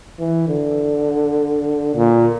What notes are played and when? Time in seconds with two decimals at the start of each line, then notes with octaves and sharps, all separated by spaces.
0.20 E3
0.49 D3
1.96 A#2